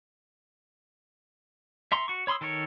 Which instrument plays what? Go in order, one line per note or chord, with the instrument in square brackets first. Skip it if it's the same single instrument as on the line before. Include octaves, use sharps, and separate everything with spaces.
[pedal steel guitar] E5 A#5 C6 C#6
F#4 C#6
C#5 B5 C6 D#6 E6
D#3 A4 A#4 C#5